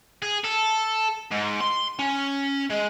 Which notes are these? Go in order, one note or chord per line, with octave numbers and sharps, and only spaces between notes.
G#4
A4
G#2
C6
C#4
G#3